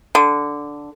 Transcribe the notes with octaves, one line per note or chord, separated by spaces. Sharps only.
D3